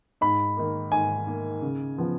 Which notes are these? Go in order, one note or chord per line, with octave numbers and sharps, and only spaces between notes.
G#2 B5
D#3 A#3
G#2 G#5
D#3 A#3
C#3
F3 B3